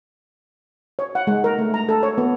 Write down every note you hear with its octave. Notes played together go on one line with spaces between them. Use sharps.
C#5
F#5
G#3
A#4
A3
A#5
A4
C#5
B3